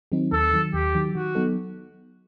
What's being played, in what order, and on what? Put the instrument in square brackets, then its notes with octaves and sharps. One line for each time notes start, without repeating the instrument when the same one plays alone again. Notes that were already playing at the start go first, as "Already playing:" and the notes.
[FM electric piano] D#3 F#3 C4 D#4
[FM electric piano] D#2 [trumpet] A4
[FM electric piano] D#3 F#3
[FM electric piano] D#2 [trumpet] G4
[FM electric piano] D#3 F#3
[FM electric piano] D#3 [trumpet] F#4
[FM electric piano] F#3 B3 D#4 A4